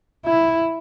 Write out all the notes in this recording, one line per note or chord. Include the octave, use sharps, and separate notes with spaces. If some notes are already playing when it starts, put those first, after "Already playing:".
E4